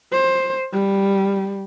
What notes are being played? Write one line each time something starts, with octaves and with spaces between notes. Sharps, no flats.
C5
G3